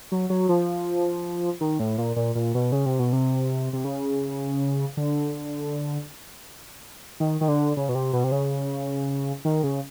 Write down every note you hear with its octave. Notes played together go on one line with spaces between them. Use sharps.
F#3
F#3
F3
D#3
A2
A#2
A#2
A#2
B2
C#3
C3
B2
C3
C3
C#3
D3
D#3
D#3
D3
C#3
B2
C3
B2
C3
C#3
D#3
C#3